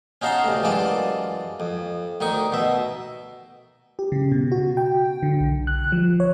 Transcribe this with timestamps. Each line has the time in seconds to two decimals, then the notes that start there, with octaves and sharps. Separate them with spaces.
0.22 C#4 D#4 F#4 F5 A5 C6
0.44 D2 C3
0.63 F#2 E3 G#3 F4 D5 A5
1.60 F2
2.21 D2 D#3 D#4 C#6
2.52 B2 E5
3.99 G4
4.12 C#3
4.32 B2
4.52 F#4
4.77 G5
5.23 D3
5.40 B1
5.67 F#6
5.92 F3
6.20 C#5